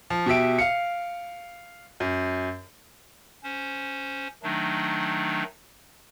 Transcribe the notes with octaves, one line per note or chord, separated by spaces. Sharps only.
F3
B2 G4 E5 D7
F5 C#7
F#2
C#4 C5
D#3 F#3 A3 D4 D#4